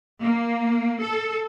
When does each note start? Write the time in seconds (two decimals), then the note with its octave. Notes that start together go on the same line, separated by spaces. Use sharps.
0.21 A#3
1.02 A4